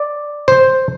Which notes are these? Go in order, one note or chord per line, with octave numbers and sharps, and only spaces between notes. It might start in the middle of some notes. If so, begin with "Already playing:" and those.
Already playing: D5
C5